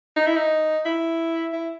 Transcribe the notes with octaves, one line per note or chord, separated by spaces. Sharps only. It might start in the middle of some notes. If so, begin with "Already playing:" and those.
D#4
E4
D#4
E4
E4